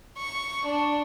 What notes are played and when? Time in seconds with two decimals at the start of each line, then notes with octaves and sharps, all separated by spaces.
0.18 C#6
0.66 D4